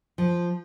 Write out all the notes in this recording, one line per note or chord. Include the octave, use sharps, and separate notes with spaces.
F3